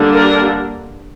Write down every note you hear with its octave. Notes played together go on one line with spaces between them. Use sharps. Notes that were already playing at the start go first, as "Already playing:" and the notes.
Already playing: D3 G3 A#3 D4
A#4